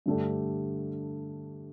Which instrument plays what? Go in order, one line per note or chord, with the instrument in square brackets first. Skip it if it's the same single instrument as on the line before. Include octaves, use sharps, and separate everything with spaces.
[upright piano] G2 D3 A3 D4 G4